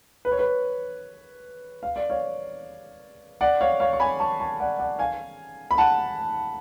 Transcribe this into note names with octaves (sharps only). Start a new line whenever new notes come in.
B4
C#5
B4
F5
D5
C#5 F5
D5 F#5
C#5 F5
C#5 F5
C#6
G#5 B5
A5 C#6
A5 C#6
D5 F#5
D5 F#5
F5 G#5
B5
F#5 A5